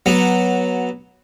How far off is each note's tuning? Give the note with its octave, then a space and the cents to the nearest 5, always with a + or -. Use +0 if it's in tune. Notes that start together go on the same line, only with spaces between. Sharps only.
F#3 +0 B3 -15